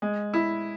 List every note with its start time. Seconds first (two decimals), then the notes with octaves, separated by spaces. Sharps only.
0.02 G#3
0.34 E4